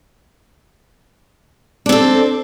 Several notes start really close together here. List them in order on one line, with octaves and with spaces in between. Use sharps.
D4 C4 A4